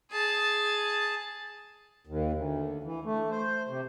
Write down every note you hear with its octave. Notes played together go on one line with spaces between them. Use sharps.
G#4 A5
D#2
D2
E3
A3
C5
C3